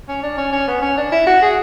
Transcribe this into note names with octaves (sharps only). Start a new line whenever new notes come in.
C#4
D4
C#4
C#4
B3
C#4
D4
E4
F#4
G#4